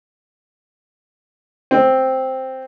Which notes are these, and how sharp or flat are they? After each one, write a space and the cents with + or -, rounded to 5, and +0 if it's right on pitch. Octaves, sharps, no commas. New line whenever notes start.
C4 +0